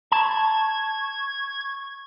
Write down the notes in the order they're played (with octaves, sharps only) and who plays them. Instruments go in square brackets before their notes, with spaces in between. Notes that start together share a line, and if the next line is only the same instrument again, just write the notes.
[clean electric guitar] A5 [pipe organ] C#6 G#6